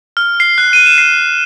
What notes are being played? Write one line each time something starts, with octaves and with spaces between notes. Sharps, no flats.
F6
C7
F#6
D#7
E7
C7